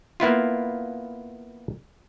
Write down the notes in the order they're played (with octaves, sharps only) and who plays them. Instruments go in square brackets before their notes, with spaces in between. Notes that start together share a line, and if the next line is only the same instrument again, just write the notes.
[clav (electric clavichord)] A#3 B3 E4 F4